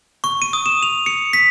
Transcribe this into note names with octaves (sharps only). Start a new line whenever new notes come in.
C#6
D#7
D#6
E7
F7
C#7
B6